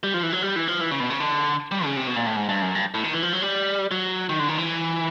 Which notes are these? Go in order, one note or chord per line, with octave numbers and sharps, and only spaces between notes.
G3
F3
E3
F#3
G3
E3
F3
E3
C#3
B2
C#3
D3
G3
C#3
C3
B2
A#2
A2
G#2
G2
F#2
G2
A2
D#3
E3
F3
F#3
G3
F#3
D#3
D3
D#3
E3